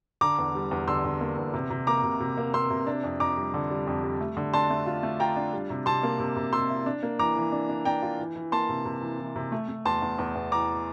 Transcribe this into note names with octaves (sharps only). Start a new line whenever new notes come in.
D3 A#5 D6
E2
G3
E2
D3 C6 E6
D3
A#3
E2
C3
C3
A#3 A#5 D6
C3
C3
A#3
A#3 C6 E6
C3
D4
F2
F2 A#5 D6
G3
D3
G3
F2
G3
A3
D3
D4 A5 C6
A3
F4
A3
F4 G5 A#5
D4
G3
C3
C3 A5 C6
A#3
C3
C3
C3 C6 E6
E4
D4
A#3
E3 A#5 D6
E3
D4
D4
D4 G5 A#5
F4
E3
E3
A#3 A5 C6
C3
C3
E3
E3
C3
A3
A3
E2 A5 C6
E2
E2
E2
E3 A#5 D6